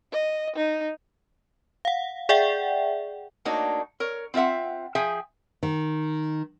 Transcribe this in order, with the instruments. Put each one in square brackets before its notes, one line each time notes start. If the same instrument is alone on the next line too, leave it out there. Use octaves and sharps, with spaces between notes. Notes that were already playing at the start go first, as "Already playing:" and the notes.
[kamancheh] D#5
D#4
[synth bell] F5 F#5
G#4 D5 E5 F#5 G5
[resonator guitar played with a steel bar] A3 A#3 D4 D#4 F#4 C#5
A#4 C#5
C4 F4 D#5 E5 F#5
F3 G#4 E5 G5 G#5
[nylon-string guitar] D#3